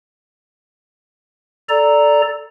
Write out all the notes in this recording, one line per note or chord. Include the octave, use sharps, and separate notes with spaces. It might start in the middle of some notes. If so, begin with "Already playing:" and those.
A4 D5 A#5